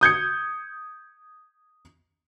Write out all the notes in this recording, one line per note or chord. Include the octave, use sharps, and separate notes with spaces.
D#6 G6 G#6 C#7